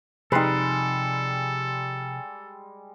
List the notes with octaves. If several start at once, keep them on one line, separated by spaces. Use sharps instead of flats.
C3 F3 G3 G#3 D#4 A4 B4